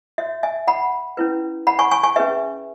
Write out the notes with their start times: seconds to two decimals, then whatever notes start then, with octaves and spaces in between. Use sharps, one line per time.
0.18 F#4 C#5 E5
0.43 E5 G#5
0.67 F#5 B5
1.17 C#4 E4 B4
1.67 F#5 B5
1.79 G#5 C#6
1.91 G#5 C#6
2.03 G#5 C#6
2.16 C#4 G#4 B4 E5